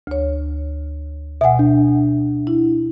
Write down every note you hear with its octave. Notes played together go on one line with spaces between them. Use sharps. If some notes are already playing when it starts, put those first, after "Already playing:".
D2 C#5
B2 E5 F#5 G#5
D4
E4